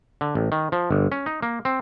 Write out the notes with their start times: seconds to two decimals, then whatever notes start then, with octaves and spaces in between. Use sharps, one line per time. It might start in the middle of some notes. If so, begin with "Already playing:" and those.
0.21 D3
0.35 A1
0.52 D#3
0.72 F3
0.91 G1
1.12 C#4
1.26 D#4
1.42 A#3
1.65 C4